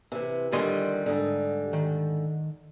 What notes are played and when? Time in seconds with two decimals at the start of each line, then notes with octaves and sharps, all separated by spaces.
0.12 C3 E3
0.53 D3 D#3 F3 G3 G#5 C6
1.06 G#2 D3
1.73 D#3